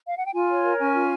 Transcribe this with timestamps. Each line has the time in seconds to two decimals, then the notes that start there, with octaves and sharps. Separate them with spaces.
0.09 F5
0.17 F#5
0.25 G5
0.34 F4 G#5
0.50 C#5
0.65 A#4
0.79 C#4 G#5
0.94 F4